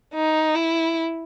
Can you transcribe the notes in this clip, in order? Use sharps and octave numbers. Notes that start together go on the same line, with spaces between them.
D#4
E4